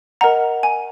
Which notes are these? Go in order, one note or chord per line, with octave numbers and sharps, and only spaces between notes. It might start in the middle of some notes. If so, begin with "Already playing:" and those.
A#4 D#5 F#5 A#5
G#5